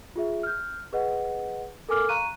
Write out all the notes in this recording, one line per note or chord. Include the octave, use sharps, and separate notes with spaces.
F4 G#4 E5
F6 G6
G#4 B4 D#5 F#5
A4 A#4 G#5 D6 F6
F5 A#5 C#6 F#6 D#7